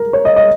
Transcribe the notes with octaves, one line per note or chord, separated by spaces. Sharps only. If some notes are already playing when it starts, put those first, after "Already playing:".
Already playing: A#4
C#5
D#5
D#5